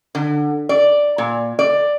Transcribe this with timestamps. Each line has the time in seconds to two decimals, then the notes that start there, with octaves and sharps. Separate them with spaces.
0.15 D3
0.69 D5
1.18 A#2
1.59 D5